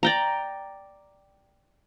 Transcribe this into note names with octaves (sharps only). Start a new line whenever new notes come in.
D5 G5 A#5